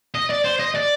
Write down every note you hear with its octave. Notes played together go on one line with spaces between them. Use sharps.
D#5
D5
C5
D#5
D5